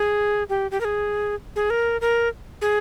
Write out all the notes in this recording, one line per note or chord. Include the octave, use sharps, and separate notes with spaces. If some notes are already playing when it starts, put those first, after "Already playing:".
Already playing: G#4
G4
G4
A#4
G#4
G#4
A#4
A#4
G#4